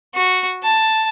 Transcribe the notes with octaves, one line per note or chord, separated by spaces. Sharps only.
F#4
A5